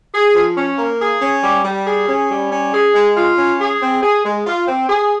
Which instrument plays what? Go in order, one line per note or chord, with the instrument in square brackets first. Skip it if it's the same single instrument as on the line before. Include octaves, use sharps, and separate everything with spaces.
[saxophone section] G#4
F3
C#4
A#3
G#4
C#4
G3
G3
G#4
C#4
G3
C#4
G#4
G#3
F4
C#4
G#4
C4
G#4
G#3
F4
C4
G#4